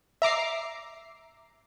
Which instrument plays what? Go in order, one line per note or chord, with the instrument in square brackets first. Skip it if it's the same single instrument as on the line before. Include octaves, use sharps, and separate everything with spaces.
[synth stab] E5 A#5 D6 C7